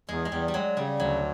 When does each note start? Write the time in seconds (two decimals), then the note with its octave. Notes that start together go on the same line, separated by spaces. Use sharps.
0.09 E2 G#3
0.25 G#3
0.31 E2 G3
0.48 G3
0.54 F#3 G#3
0.77 C#3 G3
1.00 D2 F#3